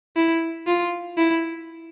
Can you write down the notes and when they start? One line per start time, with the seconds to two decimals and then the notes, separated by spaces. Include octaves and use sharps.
0.16 E4
0.67 F4
1.18 E4